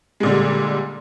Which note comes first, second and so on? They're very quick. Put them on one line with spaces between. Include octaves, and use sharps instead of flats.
G#3 A#2 D3 G3